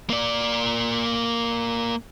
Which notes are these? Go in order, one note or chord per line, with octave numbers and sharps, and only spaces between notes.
A#3 D5